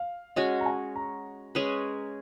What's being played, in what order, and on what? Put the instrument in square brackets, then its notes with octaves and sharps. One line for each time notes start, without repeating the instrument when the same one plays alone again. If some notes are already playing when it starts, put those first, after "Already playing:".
Already playing: [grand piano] F5
[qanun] G#3 C#4 F#4 [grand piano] D#5
[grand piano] A#5
G#5
A#5
[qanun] G#3 C#4 G#4 B4